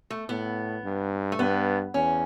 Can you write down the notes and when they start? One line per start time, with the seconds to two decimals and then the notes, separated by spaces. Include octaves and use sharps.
0.10 A3
0.29 A2 B3
0.84 G2
1.32 A3
1.39 G2 B3
1.94 E2 C#4